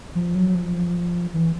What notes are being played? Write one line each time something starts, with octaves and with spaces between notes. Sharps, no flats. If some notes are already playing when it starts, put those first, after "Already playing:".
F3
F#3
F3
E3